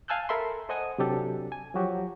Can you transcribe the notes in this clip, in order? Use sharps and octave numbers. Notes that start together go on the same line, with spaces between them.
F5 G#5 A5 E6 F#6 G6
A4 A#4 E5 B5 C6
A4 C5 D#5 F#5 G#5 D#6
C3 F#3 D4 G4 A4
G#5
F3 F#3 F#4 G4